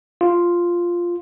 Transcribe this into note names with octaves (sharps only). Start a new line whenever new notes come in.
F4